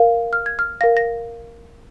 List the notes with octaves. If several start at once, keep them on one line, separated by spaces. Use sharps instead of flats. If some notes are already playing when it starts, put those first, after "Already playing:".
Already playing: A#4 F5
F6
G#6
F6
A#4 F5 A#6
A#6